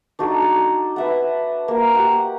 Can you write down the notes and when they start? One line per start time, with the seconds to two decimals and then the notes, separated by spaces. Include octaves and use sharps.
0.19 D4 D#4 F#4 A4
0.42 A4
0.96 B4 E5 F#5
1.68 A#3
1.93 G4 F#5 A#5 C#6